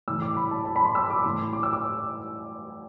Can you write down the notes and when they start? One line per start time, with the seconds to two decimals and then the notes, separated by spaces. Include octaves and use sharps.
0.08 A2 E3 E6
0.22 D6
0.37 B5
0.51 A5
0.65 A5
0.76 B5
0.85 C6
0.95 E6
1.10 D6
1.24 A2 E3 C6
1.53 D6
1.63 E6
1.73 D6